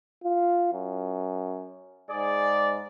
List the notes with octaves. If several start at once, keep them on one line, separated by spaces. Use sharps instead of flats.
F4
F#2
G#2 G#4 D5